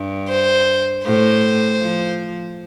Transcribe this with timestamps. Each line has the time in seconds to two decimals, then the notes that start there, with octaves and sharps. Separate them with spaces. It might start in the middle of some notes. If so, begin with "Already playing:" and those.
Already playing: G2
0.29 C5
1.05 A2 C5
1.80 F3